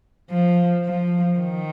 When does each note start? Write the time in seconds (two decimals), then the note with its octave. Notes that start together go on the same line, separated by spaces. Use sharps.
0.30 F3
0.85 F3
1.40 D#3